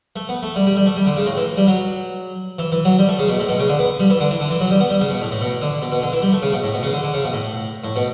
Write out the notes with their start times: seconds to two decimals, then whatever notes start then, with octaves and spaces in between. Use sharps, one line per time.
0.16 A3
0.29 B3
0.42 A3
0.56 G3
0.66 G3
0.77 G3
0.86 A3
0.96 G3
1.06 D3
1.17 C#3
1.26 A2
1.37 E3
1.57 G3
1.67 F#3
2.59 E3
2.72 E3
2.85 F#3
2.99 G3
3.08 A3
3.19 C#3
3.29 B2
3.39 A2
3.49 B2
3.59 C#3
3.69 D3
3.79 B3
4.00 G3
4.10 E3
4.20 D3
4.30 E3
4.40 D3
4.50 E3
4.60 F#3
4.71 G3
4.80 B3
4.90 G3
5.01 C#3
5.11 B2
5.21 A2
5.31 A2
5.41 B2
5.61 D3
5.82 B2
5.92 B2
6.02 D3
6.12 E3
6.22 G3
6.33 A3
6.42 C#3
6.53 B2
6.63 A2
6.73 B2
6.83 C#3
6.93 D3
7.03 D3
7.14 C#3
7.24 B2
7.33 A2
7.84 A2
7.96 B2